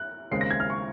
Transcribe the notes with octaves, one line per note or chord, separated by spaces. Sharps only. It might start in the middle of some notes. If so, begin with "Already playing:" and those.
Already playing: F#6
D#2 C#3 G#3 C4 C7
A#6
G#6
F6
C#6